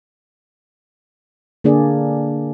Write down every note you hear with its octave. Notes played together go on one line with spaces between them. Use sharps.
D3 A#3 D4 G#4 D5